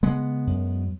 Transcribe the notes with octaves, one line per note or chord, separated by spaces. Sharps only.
C#3 G#3 B3
F#2